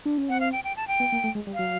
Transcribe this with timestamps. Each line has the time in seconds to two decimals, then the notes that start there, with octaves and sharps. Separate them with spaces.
0.06 D4
0.18 C#4
0.29 C4 F#5
0.40 F5
0.52 G5
0.64 G5
0.77 A5
0.88 G5
1.00 B3
1.12 A#3
1.24 A3
1.35 G#3
1.47 G3
1.54 F5
1.59 F#3